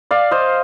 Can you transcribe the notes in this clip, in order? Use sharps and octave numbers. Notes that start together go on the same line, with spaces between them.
D5 F5
C5 D#5